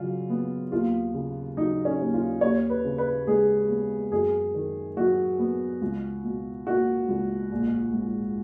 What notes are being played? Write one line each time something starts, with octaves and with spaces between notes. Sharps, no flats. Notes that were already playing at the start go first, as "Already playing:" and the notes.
Already playing: C#3 F#3 F4
B3
D#2 F4
C#3
F#3 D#4
C#4
D#2
F4
D#2 C#5
B4
C#3
B4
G#3 G#4
B3
F#2 G#4
D#3
F#3 F#4
B3
C#2
B2
A#3 F#4
C#2
A#1
G#2